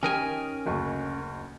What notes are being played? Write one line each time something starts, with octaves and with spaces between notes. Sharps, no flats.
D#3 C#4 G4 A#4 G#5 D#6
F#1 D2 C#6